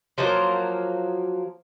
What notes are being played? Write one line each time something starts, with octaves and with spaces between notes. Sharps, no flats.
F3 F#3 A#3 C5